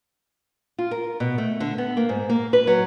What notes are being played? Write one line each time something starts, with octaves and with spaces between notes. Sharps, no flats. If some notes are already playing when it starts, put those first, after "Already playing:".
F4
A#4
B2
A3
D3
B3
A#3
G#2
A#3
B4
F#3